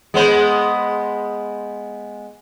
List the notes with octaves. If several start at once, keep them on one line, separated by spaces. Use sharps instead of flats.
G#3 B3 C5